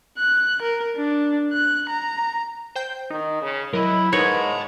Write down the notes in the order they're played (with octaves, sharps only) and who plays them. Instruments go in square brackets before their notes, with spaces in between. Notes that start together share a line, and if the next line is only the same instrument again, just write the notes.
[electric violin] F#6
A#4
D4
F#6
A#5
[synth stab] C5 G5 G6
[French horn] D#3 [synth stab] D#4
[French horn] C#3
[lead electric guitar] F#3 [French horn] E4 [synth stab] A#4 D#5
[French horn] G#2 [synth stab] D#4 A#4 B4 [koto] C#5 [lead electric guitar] A5 B5